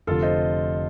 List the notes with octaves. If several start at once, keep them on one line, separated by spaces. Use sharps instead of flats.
F1 F2 D3 F4 A4
C5 D#5